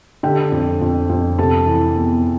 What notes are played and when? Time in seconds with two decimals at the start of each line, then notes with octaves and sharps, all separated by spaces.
0.23 D3 G4 G5
0.52 F2
0.81 F2
1.09 F2
1.38 C3 A4 A5
1.67 E3
1.96 E2